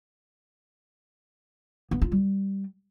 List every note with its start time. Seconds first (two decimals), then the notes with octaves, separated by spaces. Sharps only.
1.91 B3
2.02 F4
2.12 G3